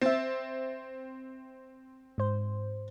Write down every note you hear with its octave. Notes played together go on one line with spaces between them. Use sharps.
C4 E5 A6
G#2 C5